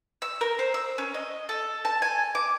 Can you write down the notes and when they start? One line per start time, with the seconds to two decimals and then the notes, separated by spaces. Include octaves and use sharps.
0.22 E6
0.41 A#4
0.59 C5
0.74 E6
0.98 C#4
1.14 D#5
1.49 A4
1.85 A5
2.02 G#5
2.35 D6